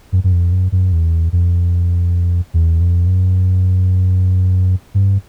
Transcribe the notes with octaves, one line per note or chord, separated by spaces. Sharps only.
F#2
F#2
F2
F#2
F#2
E2
F2
E2
F2
F#2
G2